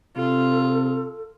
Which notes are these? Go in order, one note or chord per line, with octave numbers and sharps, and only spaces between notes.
C3 F4 A4